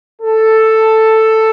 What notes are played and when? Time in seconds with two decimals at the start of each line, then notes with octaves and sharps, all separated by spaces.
0.22 A4